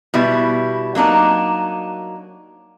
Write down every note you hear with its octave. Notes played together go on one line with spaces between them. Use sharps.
B2 G3 E4
F#3 A#3 D4 D#4